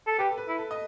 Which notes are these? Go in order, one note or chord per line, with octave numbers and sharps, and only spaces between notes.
A4
G4 B4
A4
B4
E4
A4
D#5